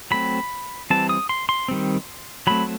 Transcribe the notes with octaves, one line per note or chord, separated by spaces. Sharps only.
F#3 A3 C4 B5
E3 G3 C4 A5
D#6
C6
C6
D#3 G3 C4
F#3 A3 C4 B5